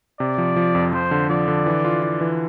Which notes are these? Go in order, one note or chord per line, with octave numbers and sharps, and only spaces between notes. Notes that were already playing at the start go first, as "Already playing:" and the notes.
C3 D5
F3
F3
F2
F3 C5
D3
F3 D5
D3
E3
F4
F4
E3